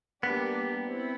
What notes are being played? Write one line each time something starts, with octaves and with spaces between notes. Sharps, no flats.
G3 A#3 B3 D4 G4
C4 E4